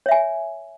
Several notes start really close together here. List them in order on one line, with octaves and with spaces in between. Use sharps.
C#5 E5 G#5